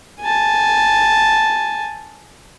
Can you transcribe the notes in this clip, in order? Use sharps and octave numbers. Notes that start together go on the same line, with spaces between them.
G#5 A5